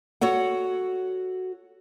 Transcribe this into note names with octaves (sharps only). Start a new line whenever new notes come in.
F#4 A4 C#5 F#5